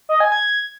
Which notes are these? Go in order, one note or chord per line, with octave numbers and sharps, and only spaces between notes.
D#5
G#5
G#6